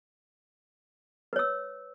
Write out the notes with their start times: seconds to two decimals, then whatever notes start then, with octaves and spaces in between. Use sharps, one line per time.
1.33 B4
1.36 C#5
1.39 E6